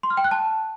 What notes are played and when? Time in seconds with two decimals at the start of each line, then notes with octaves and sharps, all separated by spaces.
0.03 C6
0.10 F6
0.17 G5
0.24 F#6
0.31 A5